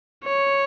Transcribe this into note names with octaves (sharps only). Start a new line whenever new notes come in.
C#5